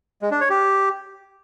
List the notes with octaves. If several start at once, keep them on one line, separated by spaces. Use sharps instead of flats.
G#3
D4
C#5
G4